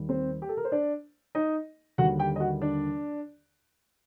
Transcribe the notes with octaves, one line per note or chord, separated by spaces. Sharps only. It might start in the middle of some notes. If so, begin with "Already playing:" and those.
Already playing: D#2 D#3 G3
C4 C5
G4
A4
A#4
C5
D4 D5
D#4 D#5
D#2 D3 G3 F#4 F#5
G4 G5
D#5
F#4 F#5
D4 D5